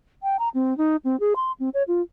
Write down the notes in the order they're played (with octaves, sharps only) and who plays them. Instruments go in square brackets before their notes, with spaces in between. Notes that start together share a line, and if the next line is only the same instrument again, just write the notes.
[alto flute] G5
A#5
C4
D#4
C4
G#4
C6
C4
C#5
F4